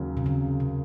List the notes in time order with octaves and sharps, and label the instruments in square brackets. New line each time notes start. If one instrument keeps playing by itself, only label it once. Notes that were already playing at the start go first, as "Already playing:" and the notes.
Already playing: [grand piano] D#2 C#3 F#3
[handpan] C3
C#3
C3